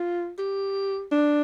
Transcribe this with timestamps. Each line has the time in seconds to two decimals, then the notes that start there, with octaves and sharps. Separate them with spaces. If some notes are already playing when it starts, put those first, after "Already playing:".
Already playing: F4
0.38 G4
1.12 D4